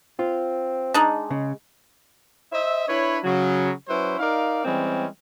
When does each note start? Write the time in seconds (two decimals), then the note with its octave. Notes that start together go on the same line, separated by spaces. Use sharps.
0.19 C4 F4
0.94 G#3 D4 D#4
1.30 C#3
2.52 C5 D#5 E5
2.88 D4 E4 B4 C#5
3.23 C#3 F#3
3.88 F#3 C#4 E4 B4 C5
4.19 D#4 A#4 D5 F5
4.64 E3 G3 G#3 C4 C#4